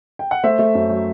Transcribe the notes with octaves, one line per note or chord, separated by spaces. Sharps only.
G5
F#5
A3 C5 E5
A3
F#2
F#3